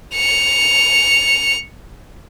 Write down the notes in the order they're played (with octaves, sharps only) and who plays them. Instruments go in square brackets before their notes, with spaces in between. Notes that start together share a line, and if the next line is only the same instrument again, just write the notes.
[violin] C#7 F7